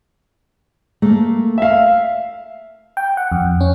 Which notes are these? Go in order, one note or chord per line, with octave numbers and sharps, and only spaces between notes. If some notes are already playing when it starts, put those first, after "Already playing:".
A3 A#3
E5 F5
G5
F#5
F2
C#4